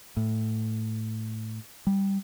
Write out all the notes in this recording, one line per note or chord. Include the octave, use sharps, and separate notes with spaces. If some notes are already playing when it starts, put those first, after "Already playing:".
A2
G3